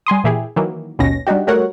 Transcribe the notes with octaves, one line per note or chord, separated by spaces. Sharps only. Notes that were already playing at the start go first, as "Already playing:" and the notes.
G3 G#5 C6 D#6
A#2 E3 E4 G4 G#4
D#3 E3 F#3 A#3
A1 D#2 B2 C#4 A#6
G3 D4 D#4 F#4 G4
G3 A3 F#4 A#4 C#5 F#5